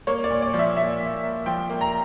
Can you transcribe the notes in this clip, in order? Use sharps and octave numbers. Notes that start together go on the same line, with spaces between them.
A#3 C#5
D5
A#2
D5
F3
E5
A#2 E5
A#2
A#3
F3 G5
A#3
A#5